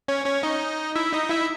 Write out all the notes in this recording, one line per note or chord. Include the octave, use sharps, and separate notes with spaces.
C#4 C#5
C#4 C#5
D#4 D#5
E4 E5
D#4 D#5
E4 E5